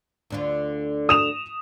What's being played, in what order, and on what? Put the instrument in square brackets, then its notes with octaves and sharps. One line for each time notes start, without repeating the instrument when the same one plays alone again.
[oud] D2 D3 F4
[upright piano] D#6 E7 F7